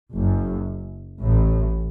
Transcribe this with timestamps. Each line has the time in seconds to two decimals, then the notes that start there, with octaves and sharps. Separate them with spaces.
0.14 F#1 F#2
1.22 A1 A2